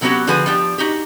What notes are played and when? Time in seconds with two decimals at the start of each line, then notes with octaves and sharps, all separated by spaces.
0.01 C3 F#3 B3 C#4 F#4 G4
0.27 D3 F3 F#4 G#4 B4 G#5
0.46 F3 D4 G4
0.78 D#4 F#4 G4